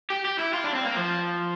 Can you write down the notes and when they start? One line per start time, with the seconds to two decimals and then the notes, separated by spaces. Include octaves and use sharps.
0.10 G4
0.25 G4
0.39 E4
0.53 F4
0.64 D4
0.75 C4
0.86 A#3
0.96 F3